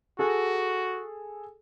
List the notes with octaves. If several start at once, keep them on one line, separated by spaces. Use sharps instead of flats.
F#4 G#4 A4